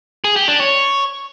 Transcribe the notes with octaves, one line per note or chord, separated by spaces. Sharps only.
G#4
G4
D4
C#5